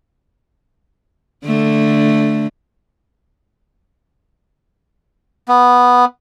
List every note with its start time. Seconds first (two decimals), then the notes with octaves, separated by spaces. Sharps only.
1.45 D3 A3
5.48 B3